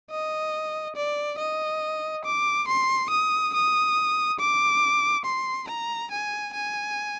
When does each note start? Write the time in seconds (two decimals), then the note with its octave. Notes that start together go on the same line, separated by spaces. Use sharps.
0.11 D#5
0.96 D5
1.38 D#5
2.25 D6
2.68 C6
3.10 D#6
3.54 D#6
4.39 D6
5.24 C6
5.68 A#5
6.11 G#5
6.53 G#5